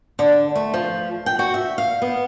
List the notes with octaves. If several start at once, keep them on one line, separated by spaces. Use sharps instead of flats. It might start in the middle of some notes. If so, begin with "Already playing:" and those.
D3
A3
F3
G5
F#4
E5
F5
B3